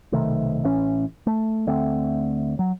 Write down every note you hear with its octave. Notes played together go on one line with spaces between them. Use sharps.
B1 C3 D#3 A3
A1 E3 C#4
A3
D2 D3 A3 C4
F#3